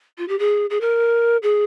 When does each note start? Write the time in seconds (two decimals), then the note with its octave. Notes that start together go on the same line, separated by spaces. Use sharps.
0.18 F4
0.28 G4
0.39 G#4
0.70 G#4
0.81 A#4
1.43 G#4